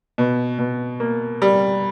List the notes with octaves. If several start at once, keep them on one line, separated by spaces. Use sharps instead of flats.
B2
B2
A#3
G3